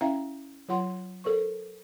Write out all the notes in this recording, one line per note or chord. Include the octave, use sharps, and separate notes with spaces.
C#4 E4 E5 F5 A#5
F#3 F4 F#5 C6
A4 A#4 C5 C#6